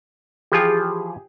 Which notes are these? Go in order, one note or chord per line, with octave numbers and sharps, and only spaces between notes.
E3 F3 F4 G4 G#4